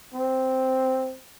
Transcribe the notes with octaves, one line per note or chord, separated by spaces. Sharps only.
C4